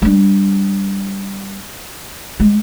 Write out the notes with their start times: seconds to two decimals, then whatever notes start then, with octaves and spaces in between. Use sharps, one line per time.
0.02 G3 D4
2.40 G#3